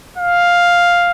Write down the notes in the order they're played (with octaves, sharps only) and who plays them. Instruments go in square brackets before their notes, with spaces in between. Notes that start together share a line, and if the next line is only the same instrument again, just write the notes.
[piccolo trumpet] F5